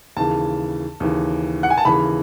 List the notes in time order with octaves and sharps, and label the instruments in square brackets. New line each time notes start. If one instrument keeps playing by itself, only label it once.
[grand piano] D#2 C#3 E3 [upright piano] A5
[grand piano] D#2 C#3 E3
[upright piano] F#5
G#5
A5
[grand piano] D#2 C#3 E3 [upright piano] B5